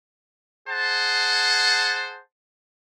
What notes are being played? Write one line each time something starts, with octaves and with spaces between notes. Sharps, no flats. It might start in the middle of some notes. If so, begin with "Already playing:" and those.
G#4 C5 F#5 A5